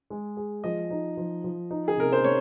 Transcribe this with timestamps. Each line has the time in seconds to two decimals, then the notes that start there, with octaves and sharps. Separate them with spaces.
0.10 G#3
0.37 G#4
0.64 F3 D#5
0.90 D#4
1.17 F3
1.44 F3
1.71 D#4
1.88 G#4
1.97 C3 A#4
2.12 C5
2.24 A#3 C#5